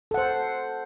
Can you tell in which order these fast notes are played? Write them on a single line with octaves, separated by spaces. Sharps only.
A4 F#5 C5